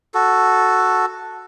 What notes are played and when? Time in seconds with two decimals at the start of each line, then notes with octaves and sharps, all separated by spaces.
0.14 F#4 A4